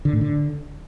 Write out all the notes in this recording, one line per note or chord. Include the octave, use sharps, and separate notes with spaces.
D3
A2
D3